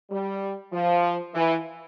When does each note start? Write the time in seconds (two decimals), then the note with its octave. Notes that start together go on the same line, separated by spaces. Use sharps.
0.11 G3
0.73 F3
1.35 E3